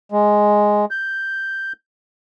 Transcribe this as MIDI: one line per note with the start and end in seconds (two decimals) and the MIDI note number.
0.12 0.85 56
0.91 1.73 91